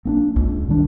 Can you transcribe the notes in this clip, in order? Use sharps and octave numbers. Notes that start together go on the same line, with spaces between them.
A#3 C4 D4
C#2
C3 D#3 G3 D4